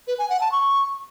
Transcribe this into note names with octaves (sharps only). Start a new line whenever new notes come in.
B4
G#5
F#5
A5
C#6